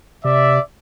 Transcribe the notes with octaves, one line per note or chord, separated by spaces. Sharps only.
C3 D5 E5